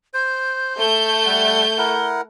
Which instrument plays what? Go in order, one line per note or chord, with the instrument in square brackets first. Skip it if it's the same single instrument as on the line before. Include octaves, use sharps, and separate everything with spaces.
[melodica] C5 [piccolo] G6
[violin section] A3 G6 [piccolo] G7
[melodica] G3 F#5
E4 A#4 F#5